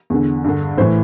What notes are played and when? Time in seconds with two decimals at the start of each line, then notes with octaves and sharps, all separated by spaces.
0.10 E2 D3
0.44 G2 D3
0.78 A2 C5
0.81 E3